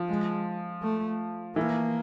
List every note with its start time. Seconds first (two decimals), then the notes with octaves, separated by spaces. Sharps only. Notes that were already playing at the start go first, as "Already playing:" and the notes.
Already playing: F3
0.09 G#3
0.82 A3
1.56 E3 A#3